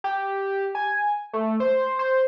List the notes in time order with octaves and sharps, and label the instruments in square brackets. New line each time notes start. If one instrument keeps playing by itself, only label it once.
[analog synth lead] G4
G#5
A3
C5
C5